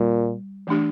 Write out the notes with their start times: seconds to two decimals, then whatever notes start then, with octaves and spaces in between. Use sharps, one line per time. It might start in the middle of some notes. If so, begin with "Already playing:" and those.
Already playing: A#2 G3
0.67 E3 A3 D4 G4